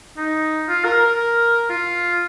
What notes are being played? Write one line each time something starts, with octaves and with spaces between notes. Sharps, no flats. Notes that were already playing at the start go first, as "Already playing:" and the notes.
D#4
F4
A#4
A#4
F4